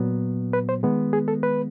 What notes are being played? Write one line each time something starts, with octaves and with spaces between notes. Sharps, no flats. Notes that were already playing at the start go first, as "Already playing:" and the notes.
Already playing: A#2 F#3 B3
B4
C5
D#3 G#3 B3
G#4
A4
B4